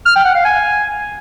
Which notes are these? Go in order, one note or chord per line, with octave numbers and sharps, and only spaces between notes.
F6
G5
F#5
F5
G#5